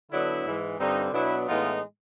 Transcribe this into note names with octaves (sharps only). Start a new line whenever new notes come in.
D3 F#3 B3 D4 E4
G#2 E3 G#3
G2 D3 G3 C4 D#4
B2 F#3 B3 D4 E4
A2 E3 G#3 B3 D#4 F4